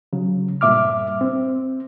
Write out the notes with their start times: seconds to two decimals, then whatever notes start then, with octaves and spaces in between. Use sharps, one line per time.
0.13 C#3 F#3
0.61 G2 A#2 E5 D6 F6
1.21 C4